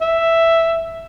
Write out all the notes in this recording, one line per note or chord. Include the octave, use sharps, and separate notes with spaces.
E5